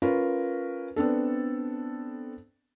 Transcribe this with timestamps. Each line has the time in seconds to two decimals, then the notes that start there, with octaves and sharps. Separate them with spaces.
0.02 C#4 F4 A#4 B4
0.96 B3 C4 D4 A4